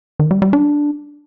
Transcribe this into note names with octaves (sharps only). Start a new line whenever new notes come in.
D#3
G3
G3
D4